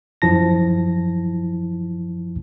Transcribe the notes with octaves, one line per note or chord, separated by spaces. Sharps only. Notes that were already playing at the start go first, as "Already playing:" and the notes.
F#2 F3 E4 A5 A#6